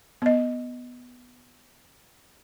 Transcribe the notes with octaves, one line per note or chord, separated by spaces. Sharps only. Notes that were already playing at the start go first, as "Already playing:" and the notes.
B3 D#5